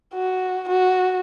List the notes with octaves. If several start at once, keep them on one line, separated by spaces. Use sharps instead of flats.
F#4
F#4